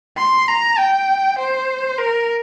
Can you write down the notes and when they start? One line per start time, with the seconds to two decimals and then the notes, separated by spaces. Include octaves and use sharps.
0.17 C6
0.48 A#5
0.78 G5
1.38 C5
1.98 A#4